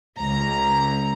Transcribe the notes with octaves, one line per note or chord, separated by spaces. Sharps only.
C#2 A#5